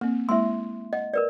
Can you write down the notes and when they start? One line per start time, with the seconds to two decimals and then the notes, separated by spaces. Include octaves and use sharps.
0.01 A#3 C4
0.29 G#3 A#3 E4 E5 C6
0.93 D#5 F#5
1.14 A#4 B4 D5